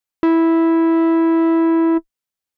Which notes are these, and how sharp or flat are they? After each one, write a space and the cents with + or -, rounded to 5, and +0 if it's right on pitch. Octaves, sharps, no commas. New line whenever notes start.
E4 -5